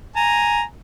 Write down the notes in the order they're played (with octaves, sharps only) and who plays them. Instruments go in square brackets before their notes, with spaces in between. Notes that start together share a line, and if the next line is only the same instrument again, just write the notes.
[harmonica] G#5 A#5